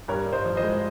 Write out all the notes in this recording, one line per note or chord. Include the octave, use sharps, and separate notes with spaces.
G2 A#4 C#5
G2
C5 D#5
F3
C5 D#5
G#3